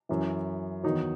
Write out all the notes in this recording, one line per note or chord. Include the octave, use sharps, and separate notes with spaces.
F#2 E3
E2 D#3 F#3 D#4